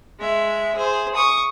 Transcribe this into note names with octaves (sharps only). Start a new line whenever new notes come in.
G#3 E5
G#4 C5
C#6 D#6